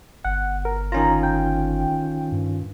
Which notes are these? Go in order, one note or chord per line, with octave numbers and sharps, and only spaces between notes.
G1 F#5
A#4
D#3 C#4 F4 A#5
G5
G2